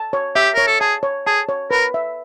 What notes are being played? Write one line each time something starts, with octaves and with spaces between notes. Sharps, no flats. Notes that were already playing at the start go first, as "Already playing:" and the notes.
Already playing: A5
C#5
G4 E5
A#4 C#5
A4
G#4 A5
C#5
G#4 A5
C#5
A#4 B4
E5